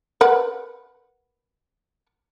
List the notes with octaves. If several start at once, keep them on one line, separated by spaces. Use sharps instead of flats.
A#4 B4 F#5